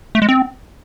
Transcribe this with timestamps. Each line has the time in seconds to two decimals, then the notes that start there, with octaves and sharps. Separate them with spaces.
0.15 A3
0.22 G#3
0.29 C4